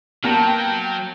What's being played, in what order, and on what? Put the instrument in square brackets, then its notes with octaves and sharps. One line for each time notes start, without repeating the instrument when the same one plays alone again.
[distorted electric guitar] F#3 [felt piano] A#3 B3 [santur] F5 A5 A#5 [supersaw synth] G5